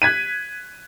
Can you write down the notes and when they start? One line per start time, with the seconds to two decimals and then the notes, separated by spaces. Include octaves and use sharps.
0.02 F#6 G#6 B6 D#7